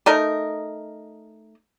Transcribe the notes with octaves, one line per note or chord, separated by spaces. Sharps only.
A3 D#4 A#4